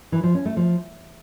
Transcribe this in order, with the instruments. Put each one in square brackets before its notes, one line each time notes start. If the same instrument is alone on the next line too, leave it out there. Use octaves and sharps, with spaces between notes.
[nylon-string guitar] E3
F3
C#4
A3
F3